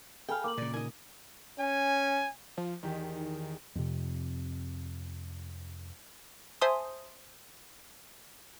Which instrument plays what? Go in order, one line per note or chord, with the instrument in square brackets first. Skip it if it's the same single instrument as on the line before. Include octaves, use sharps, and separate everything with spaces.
[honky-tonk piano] G#4 A4 B5 [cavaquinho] F5 G5 [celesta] G#5
[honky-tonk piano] A#3 [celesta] D6 F#7
[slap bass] A#2 C#3 [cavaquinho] D5
[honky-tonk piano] D#3 [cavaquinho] D#5 G#5
[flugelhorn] C#4 [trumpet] G#5
[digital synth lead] F3
[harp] E2 G4 B6 [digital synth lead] D#3
[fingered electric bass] F2 C3
[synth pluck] C5 E5 G#5 A5 C6 D#6